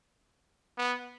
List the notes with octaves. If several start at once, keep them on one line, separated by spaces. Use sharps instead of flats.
B3